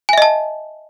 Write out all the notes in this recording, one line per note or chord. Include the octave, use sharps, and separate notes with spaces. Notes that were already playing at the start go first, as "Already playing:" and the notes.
D#5 E5 G#5 A5